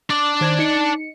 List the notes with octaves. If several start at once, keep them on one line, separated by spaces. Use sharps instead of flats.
D4 D5
D#3 C5 G#6
D#4 C#7